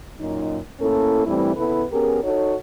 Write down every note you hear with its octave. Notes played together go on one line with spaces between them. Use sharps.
F#2 A#2 F#3 D#4
A2 A#3 C#4 E4 A4
G2 E3 G3 A3 C4 E4
C#3 B3 E4 A4 B4
B3 C#4 G4 G#4 A#4
D#4 F#4 A4 C#5